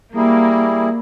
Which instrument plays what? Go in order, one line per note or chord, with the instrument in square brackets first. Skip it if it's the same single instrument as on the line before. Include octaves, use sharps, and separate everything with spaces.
[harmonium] G3 E4 G#4 [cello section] A#3